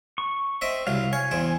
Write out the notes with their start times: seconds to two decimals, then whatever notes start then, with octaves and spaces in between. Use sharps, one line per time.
0.18 C#6
0.61 C4 D#5 E5
0.87 C2 F#3 F5
1.13 C#5 G#5
1.31 E2 C4